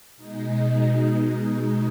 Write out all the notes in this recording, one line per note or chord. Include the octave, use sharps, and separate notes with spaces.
B2 G#3 D#4